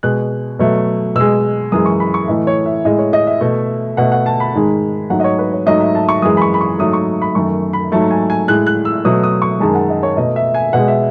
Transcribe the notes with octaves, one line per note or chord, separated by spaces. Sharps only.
B2 G#3 F#6
B2 F#3 A3
B2 G#3 E6
F#2 E3 G#3 D#6
C#6
B5
C#6
A2 E3 A3 D#5
C#5
E5
A2 G#3 D#5
C#5
D#5
E5
B2 A3
B2 A3 F#5
F#5
A5
B5
G#2 D#3 G#3
G#2 F#3 A3 F#5
D#5
C#5
B4
C#5
G#2 F#3 A3 D#5
E5
A5
C#6
F#2 E3 G#3 D#6
B5
C#6
B5
C#6
G#2 F#3 A3 D#6
C#6
B5
F#2 D#3 A3 C#6
B5
G#2 F#3 A3 A5
G#5
G#5
A2 G#3 F#6
F#6
E6
B2 F#3 A3 D#6
D#6
C#6
F#2 D#3 G#3 A5
F#5
D#5
C#5
B2 A3 D#5
E5
G#5
B2 G#3 F#5
E5